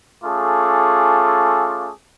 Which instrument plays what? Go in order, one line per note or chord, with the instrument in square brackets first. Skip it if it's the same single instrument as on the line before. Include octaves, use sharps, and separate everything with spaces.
[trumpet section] A3 C#4 F4 G#4 A4 D6